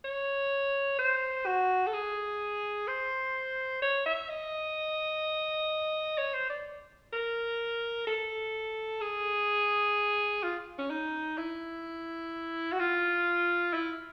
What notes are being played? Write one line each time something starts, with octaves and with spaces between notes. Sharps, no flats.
C#5
C5
F#4
A4
G#4
C5
C#5
E5
D#5
C#5
C5
D5
A#4
A4
G#4
F4
C#4
D#4
E4
F#4
F4
E4